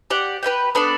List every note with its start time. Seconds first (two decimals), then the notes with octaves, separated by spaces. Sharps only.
0.10 G4 D5 F#5
0.43 G4 B4 E5 G5
0.75 B3 D4 A4 D5